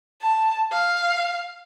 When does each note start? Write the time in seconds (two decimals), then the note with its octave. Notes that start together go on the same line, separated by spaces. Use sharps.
0.22 A5
0.72 F5